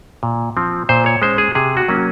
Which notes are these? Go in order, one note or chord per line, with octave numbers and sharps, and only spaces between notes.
A#2
F3 C4
A#2 C5
C#5
G#3 C#4 C5
G#4
C3 G#4
F#4
F#3 A#3 C#4